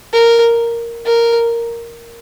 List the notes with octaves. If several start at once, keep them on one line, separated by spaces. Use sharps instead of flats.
A#4
A#4